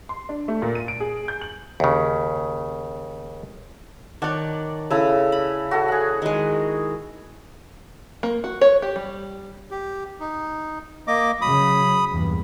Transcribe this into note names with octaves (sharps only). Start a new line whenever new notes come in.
C6
D4
A3
A#2
D#7
D7
G#4
G6
F#7
D#2 C#3
D#3 C#5 D5 F#5 A5
C#3 E4 A4 E6
B5
F#4 A4 A5
G#4 F#5
D#3 G#3
A#3
F#4
C#5
G4
G3
G4
D#4
A#3 D#5 D6
C#3 F#3 B5 D#6
E2 G2 A#2